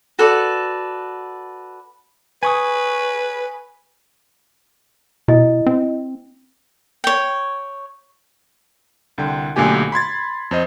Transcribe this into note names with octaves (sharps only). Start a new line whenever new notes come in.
F#4 A4 B4 D5
B4 G#5 C#6 D#6
B2 E4 D#5
C4
C#5 G5
C2 D3 G5
B1 A#2 D3 A3 G4 G#5
B5 C6 G#6 A6
F2 C5 D#5